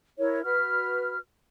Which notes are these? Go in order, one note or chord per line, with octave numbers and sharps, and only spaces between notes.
E4 A#4 C#5
F#4 B4 F6